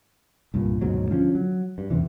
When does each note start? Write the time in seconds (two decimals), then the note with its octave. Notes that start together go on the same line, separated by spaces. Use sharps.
0.54 C2 G2 A#2
0.81 D2 G#2 B2 F#3
1.10 D3 F3 C4 C#4
1.35 F#3
1.78 G2
1.90 E2 A2 C3 E3